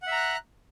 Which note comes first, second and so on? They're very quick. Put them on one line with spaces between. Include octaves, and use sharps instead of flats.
F#5 E5 A#5 F#6